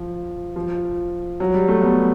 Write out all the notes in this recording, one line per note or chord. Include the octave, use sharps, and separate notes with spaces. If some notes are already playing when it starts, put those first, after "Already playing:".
Already playing: F3
F3
F#3
G3
A3
B3